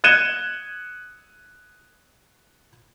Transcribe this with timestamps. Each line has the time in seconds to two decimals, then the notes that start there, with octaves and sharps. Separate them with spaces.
0.04 F#6 G#6 C#7 D#7 E7 G7